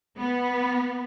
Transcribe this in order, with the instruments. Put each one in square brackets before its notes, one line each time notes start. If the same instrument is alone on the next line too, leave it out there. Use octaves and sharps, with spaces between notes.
[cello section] B3